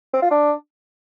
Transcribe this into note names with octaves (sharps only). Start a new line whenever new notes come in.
C4
F4
D4